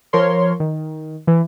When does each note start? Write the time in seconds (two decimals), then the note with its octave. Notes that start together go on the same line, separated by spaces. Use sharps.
0.13 F3 A#4 C#5 C6
0.60 D#3
1.27 E3